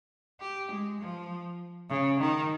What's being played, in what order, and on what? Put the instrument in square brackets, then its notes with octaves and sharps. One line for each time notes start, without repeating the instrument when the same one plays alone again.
[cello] G4
G#3
F3
C#3
D#3